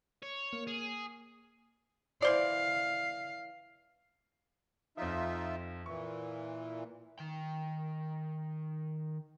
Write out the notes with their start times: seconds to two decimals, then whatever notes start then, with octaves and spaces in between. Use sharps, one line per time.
0.23 C#5
0.53 A#3
0.67 G#4
2.22 E3 C5 D5 F5
4.97 F2 F3 D#4 F4 E5
5.86 A#2 E3 C#6
7.19 D#3 G5